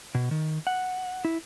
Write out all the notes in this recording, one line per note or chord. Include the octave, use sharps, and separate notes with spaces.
B2
D#3
F#5
E4